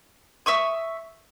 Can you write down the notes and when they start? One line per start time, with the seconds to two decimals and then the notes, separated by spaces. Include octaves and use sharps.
0.46 E5 C#6 D#6